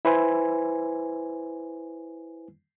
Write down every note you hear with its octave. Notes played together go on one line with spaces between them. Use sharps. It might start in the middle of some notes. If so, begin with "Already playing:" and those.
E4 B4 C5 G#5